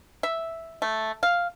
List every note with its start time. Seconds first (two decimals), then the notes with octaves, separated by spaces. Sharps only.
0.23 E5
0.82 A3
1.23 F5